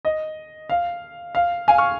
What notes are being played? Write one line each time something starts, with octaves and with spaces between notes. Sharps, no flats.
D#5
F5
F5
F5 G#5
C#6 F6